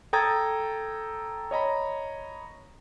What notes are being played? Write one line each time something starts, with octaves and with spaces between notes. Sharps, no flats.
A4 G5 A#5 D#6 G#6 A6
C#5 D#5 A#5 B5